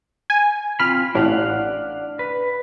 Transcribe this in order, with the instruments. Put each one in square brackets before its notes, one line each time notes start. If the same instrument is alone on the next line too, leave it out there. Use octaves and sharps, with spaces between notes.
[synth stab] G#5
[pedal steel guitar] C4 F4 B5 [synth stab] F6
[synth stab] A1 A2 [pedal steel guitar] D4 F5 F#5
[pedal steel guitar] B4